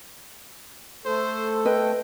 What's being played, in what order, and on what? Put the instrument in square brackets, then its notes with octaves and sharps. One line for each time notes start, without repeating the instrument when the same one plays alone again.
[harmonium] A3 A4 [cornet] C5
[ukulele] B4 D#5 [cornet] G5